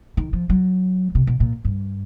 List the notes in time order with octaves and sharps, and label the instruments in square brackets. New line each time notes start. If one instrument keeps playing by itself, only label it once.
[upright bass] D#3
F3
F#3
C3
B2
A#2
G2